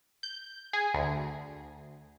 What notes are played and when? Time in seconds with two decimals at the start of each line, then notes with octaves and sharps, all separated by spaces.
0.23 G6
0.73 G#4
0.94 D2